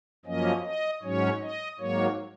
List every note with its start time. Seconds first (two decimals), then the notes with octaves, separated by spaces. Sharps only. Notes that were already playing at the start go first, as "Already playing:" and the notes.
0.25 F#2 F3 A#3 C#4 D#5
0.64 D#5
1.03 G#2 F#3 C#4 C#5
1.41 D#5
1.79 G#2 F#3 A#3 C#5